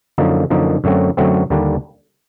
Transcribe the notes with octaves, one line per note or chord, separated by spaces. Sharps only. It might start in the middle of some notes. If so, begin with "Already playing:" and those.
F#2 D3 F3 A#3 D#4
F#2 D3 F3 A#3 D#4
F#2 D3 F#3 A3 C4
F#2 D3 F#3 A3 C4
D#2 D3 G3 A#3 D4